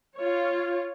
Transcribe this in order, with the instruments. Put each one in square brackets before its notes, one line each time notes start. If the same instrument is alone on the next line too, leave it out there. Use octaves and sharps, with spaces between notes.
[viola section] F4 C#5